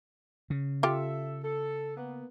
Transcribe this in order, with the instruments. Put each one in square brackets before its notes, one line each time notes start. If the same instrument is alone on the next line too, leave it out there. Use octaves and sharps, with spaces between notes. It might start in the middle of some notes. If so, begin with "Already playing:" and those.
[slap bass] C#3
[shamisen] F4 G4 [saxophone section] A4 E5
[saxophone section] A4
A#3 B3